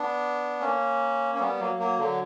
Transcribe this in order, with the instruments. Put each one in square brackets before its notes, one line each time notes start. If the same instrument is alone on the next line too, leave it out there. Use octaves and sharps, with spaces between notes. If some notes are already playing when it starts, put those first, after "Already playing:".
Already playing: [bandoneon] B3 D4
A#3 C#4
C#4
G3 B3
F#3 A#3
F#3 A#3
D3 F#3